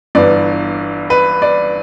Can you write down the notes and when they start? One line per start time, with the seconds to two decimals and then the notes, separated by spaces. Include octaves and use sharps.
0.15 G1 G2 E3 B3 D5
1.10 B4
1.42 D5